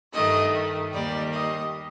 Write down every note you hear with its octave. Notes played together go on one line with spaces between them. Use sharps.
G2 D#3 A3 D#5
D#2 D#3 G3 D5
D#5